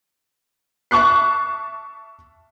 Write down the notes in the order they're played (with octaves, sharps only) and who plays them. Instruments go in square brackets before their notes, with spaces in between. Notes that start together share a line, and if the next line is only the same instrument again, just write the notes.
[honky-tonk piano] E5 A5 C#6 D6 F#6 C7